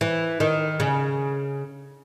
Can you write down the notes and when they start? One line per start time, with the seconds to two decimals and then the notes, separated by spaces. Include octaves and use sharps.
0.01 E3
0.40 D#3
0.80 C#3